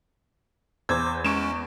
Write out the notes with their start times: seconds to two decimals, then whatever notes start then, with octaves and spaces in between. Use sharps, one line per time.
0.89 E2 C5 D6 E6 G#6
1.24 G#3 C#4 C#6 D7 E7